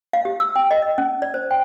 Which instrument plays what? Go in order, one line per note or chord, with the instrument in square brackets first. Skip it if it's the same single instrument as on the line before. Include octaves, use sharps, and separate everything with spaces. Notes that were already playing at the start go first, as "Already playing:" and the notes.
[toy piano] F5
G4
E6
G5
D#5
D#5
C#4
D5
C5
G5